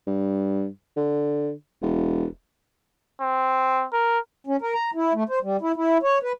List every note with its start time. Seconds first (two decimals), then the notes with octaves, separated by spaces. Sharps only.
0.07 G2
0.97 D3
1.82 E1
3.21 C4
3.93 A#4
4.47 C#4
4.62 A#4
4.74 A#5
4.94 E4
5.14 A3
5.29 C5
5.43 G3
5.61 E4
5.76 E4
6.03 C#5
6.23 B4